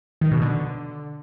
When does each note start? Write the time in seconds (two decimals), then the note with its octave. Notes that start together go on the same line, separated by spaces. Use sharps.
0.21 D#3
0.32 B2
0.42 D3